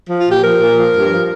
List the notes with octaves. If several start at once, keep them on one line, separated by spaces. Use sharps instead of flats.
F3
F4
A#2 G4
F3 A#4
A#2
F3
G2
F3